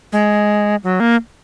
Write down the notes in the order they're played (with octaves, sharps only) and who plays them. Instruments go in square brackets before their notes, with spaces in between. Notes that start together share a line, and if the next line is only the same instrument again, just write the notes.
[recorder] G#3
F#3
A#3